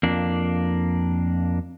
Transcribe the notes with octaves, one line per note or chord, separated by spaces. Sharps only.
F2 A#3 D4